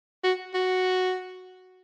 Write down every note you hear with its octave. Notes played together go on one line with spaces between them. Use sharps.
F#4
F#4